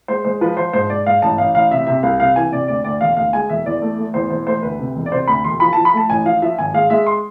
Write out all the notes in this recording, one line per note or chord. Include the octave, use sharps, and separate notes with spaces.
G#3 C5
G#3 C5
F3 B4
F3 C5
G#2 C5
G#2 D5
G#2 F5
A1 A5
A1 F5
A1 F5
C3 E5
C3 E5
C2 F5
C3 F5
E3 G#5
C3 D5
D2 D5
D2 D5
E1 F5
D2 F5
G#3 G#5
E1 E5
E2 D5
A3
A3
E2 C5
E1 C5
A3 C5
D2 B4
C3
E1
D5
C3 C5
D2 B5
E1 C6
F3 B5
A5
F3
B5
A3 A5
A1 G#5
F3 F5
F3 E5
G#1 G#5
G#3 F5
G#3 E5
C6